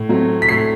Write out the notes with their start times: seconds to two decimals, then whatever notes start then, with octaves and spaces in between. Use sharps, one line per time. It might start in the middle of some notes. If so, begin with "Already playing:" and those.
Already playing: A2
0.09 F#3 A3 C4
0.42 B6
0.48 A2 C7